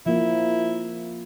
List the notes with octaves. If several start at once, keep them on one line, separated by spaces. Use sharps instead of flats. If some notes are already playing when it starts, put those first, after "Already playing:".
F3 A#3 E4